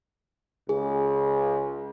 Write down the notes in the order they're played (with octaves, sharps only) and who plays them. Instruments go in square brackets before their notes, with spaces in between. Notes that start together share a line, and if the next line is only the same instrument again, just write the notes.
[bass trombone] C#2 [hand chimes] G#4